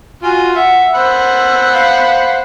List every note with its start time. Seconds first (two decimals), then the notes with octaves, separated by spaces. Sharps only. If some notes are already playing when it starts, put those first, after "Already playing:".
0.23 F4 F#4 G#5
0.55 E5 F#5
0.95 C5 F#5 B5 E6
1.73 F5